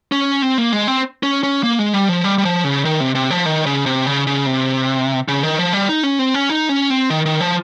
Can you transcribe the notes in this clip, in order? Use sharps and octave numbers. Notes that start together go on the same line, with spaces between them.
C#4
C4
A#3
G#3
C4
C#4
C#4
A#3
G#3
G3
F3
G3
G3
F3
C#3
D#3
C3
C3
F3
D#3
C#3
C3
C#3
C#3
C3
C#3
D#3
F3
G3
D#4
C#4
C4
C#4
D#4
C#4
C4
D#3
D#3
F3